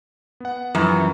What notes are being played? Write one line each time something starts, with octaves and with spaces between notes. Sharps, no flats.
B3 F#5
F#2 E3 F3 G3